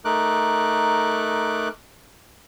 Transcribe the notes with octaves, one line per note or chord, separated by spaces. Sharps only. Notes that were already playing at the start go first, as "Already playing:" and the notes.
A3 D#4 A#4 D6 F#6